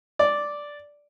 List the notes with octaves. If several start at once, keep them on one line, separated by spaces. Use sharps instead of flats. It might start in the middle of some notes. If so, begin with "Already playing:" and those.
D5